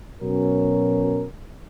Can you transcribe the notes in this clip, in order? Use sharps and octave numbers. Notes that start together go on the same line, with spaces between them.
B2 F#3 C#4 A#4